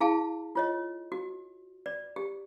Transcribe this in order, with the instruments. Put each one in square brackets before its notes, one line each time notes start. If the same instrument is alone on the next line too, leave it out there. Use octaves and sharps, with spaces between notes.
[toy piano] E4 G#4 F5 A5
F4 C#5 D#5
F#4
D5
G4